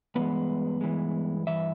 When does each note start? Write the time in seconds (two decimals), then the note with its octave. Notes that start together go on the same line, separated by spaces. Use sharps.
0.15 G2 E3 G#3 B3 B4
0.81 G2 E3 G#3
1.47 G2 E3 E5